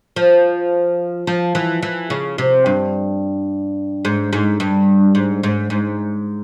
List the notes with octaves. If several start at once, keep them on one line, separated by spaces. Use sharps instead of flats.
F3
F3
E3
E3
C#3
C3
G2
G#2
G#2
G2
G#2
G#2
G#2